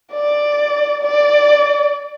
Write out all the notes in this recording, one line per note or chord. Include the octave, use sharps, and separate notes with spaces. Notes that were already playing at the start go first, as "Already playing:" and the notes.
D5
D5